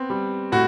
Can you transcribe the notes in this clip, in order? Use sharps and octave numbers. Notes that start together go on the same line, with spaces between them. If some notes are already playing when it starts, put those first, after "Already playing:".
Already playing: B3 C4
G3
A2 F#4